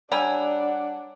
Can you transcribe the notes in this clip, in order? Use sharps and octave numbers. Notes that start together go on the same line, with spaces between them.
G3 D4 C#5 F#5 G#5 A#5 E6